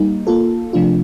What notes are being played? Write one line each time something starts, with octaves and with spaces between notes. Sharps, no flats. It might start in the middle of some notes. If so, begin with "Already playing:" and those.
Already playing: G3 A#3 D#4
A#3 F4 A4
C3 F3 A3 D4 F4